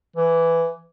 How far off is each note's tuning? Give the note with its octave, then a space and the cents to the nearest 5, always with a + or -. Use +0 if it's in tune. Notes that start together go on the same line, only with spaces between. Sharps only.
E3 +10